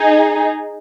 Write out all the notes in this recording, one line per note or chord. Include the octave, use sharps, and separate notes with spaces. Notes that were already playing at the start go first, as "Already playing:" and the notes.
Already playing: D#4 G#4